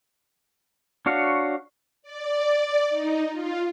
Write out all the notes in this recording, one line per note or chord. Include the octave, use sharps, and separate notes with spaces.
D4 F#4 C#5 F5
D5
D#4
F4